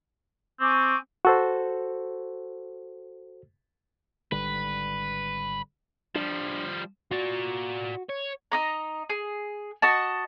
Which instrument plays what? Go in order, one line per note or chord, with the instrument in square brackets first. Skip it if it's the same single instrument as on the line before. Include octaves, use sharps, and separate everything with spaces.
[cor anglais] C4 [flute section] G#5 C#6 D6
[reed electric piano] F#4 A4 C5
[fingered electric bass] G#1 D3 G3 [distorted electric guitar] B4
[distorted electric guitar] F3 G3 [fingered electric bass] D4
[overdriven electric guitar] F4 D5 [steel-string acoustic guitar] F#4
[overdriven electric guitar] C#5
[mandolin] D#4 D#5 A#5
G#4
F#4 D#5 A5